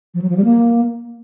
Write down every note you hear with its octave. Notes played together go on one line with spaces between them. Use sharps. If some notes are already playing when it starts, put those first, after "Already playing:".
F3
F#3
F3
G3
A#3